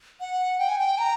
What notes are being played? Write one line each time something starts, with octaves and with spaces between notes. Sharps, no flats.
F#5
G5
G#5
G5
A#5